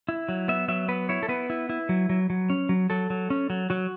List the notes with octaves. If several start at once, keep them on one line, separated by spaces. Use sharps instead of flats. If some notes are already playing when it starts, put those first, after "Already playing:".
E4
F#3
B3 E5
F#3 E5
B3 B4
E4 C#5
A4
B3 B4
E4
E4
F#3
F#3
F#3
C#4
F#3
F#3 A4
F#3
C#4
F#3
F#3 F#4